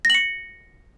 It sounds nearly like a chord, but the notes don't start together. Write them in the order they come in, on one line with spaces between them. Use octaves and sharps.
A#6 F#7 C#7